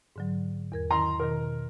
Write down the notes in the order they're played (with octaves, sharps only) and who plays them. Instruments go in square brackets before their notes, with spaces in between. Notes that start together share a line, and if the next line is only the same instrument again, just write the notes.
[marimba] G#2 D3 F#3
E2 A#4 G#6
[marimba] D#3 E4 [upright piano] A#5 C6
[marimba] B2 D#3 [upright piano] A#4